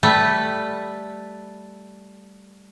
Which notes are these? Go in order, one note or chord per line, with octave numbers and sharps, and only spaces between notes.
G3 A3 B4